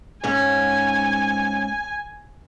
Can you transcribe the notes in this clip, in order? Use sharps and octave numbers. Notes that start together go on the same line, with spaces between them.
G#2 C#4 G#5